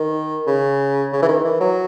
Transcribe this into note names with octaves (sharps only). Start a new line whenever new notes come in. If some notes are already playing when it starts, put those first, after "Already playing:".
Already playing: D#3
C#3
C#3
E3
D#3
E3
F#3